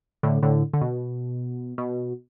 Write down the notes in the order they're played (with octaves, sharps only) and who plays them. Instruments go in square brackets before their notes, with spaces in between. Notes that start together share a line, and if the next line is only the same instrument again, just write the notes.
[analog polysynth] A2 D3
A2 D3
D3
B2
B2